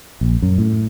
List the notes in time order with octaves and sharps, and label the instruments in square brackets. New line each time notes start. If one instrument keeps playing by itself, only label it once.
[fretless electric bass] A#1
F#2
A2